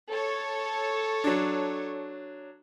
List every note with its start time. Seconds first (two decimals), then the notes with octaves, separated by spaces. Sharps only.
0.12 A4 C#5
1.24 F#3 D4